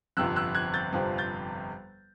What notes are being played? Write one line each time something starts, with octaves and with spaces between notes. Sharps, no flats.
G1 F2 C3 F3 E6 F#6
E6 F#6
F#6 G#6
G6 A6
G1 F2 C3 F3
G6 A6